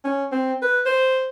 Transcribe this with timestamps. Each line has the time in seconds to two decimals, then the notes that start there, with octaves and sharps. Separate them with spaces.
0.04 C#4
0.32 C4
0.62 B4
0.86 C5